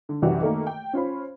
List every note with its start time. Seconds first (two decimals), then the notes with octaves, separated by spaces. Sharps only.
0.09 D3
0.22 C2 F#2 E3 F#4 G4 D5
0.41 D#3 A3 A#3
0.67 G5
0.93 C#4 F4 C5 B5